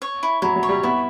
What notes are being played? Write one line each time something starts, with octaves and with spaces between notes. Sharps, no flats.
C#5
E4
F#3 E4
F#3
C#5
G3
B3 E4